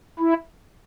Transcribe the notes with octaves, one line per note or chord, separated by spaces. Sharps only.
E4